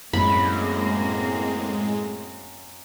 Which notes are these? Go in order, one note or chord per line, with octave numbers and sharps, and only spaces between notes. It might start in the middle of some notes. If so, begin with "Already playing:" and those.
F#2 A2 G#3 A#3 C4 B5